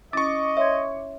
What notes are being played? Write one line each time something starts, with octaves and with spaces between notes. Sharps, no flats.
C#4 E4 D#5 C#6 D6 A6
C#5 E5 C6 G#6